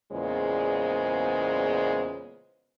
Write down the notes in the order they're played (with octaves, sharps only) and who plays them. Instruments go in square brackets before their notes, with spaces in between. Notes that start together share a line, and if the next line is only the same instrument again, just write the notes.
[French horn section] E2 A#2 C#3 G#3 B3 C5